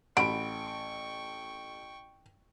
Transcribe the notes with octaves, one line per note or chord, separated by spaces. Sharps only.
A1 F#4 G5 B5 C#6 D7